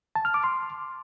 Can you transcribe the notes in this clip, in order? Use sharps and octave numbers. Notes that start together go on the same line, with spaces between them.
A5
F6
D6
C6